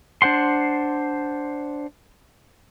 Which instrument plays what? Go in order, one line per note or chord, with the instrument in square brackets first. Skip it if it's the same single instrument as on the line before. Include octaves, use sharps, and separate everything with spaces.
[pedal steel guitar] D4 C5 F#5 C6